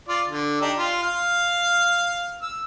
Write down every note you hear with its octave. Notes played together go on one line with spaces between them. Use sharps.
F4 D5
D3
D4 D#4 G4
F4
F5
E6